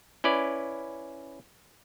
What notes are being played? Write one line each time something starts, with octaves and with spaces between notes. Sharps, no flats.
C#4 E4 B4 D5